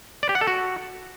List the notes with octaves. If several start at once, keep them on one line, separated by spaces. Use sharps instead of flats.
D5
G4
F#5
A4
F#4